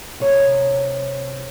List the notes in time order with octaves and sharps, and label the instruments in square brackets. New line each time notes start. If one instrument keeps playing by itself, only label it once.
[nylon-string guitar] C3 C#5